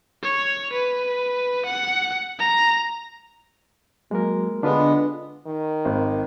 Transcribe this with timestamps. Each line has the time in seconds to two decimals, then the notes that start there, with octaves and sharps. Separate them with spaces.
0.23 C#5
0.73 B4
1.66 F#5
2.39 A#5
4.11 F#3 G#3 A#3 A#4
4.63 D3 G#3 B3 D4 F4 B4
5.47 D#3
5.85 G#1